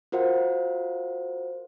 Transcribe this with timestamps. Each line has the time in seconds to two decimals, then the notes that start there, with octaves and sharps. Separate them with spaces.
0.12 F4 F#4 A#4 C5 F5 F#5